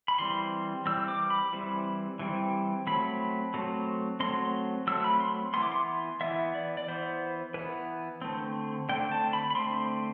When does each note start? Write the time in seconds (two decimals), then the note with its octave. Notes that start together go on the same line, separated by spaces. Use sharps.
0.08 B5
0.19 E3 G3 C4 C6
0.86 E3 G3 C4 E6
1.08 D6
1.30 B5
1.53 E3 G3 C4
2.19 E3 G3 C4
2.87 F#3 A3 C4 B5
3.54 F#3 A3 C4
4.20 F#3 A3 C4 C6
4.87 F#3 A3 C4 E6
5.04 B5
5.20 C6
5.54 E3 B3 C6
5.63 D6
5.72 C6
6.21 E3 B3 E5
6.54 D5
6.77 D5
6.88 E3 B3 C5
7.54 E3 B3 B4
8.22 D3 A3 C4
8.89 D3 A3 C4 G5
9.12 A5
9.33 B5
9.50 B5
9.55 D3 A3 C4 C6